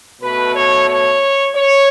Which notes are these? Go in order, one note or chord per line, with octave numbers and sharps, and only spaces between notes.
B2 A3 B4
C#5
C#5
C#5